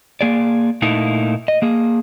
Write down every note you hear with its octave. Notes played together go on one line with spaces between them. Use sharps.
A#3 G#4 D5
A#2 A3 A#3 D#4 E4
D#5
A#3 G#4